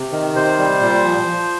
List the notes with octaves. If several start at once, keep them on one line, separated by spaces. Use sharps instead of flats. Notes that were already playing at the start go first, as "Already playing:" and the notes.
Already playing: C3
D#3
C3 C5
G3
A#2
F3
F3